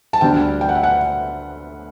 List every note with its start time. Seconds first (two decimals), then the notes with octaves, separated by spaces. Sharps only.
0.13 A5
0.21 D2 D3 G3 D4 G5
0.61 G5
0.69 F#5
0.75 E5
0.83 F#5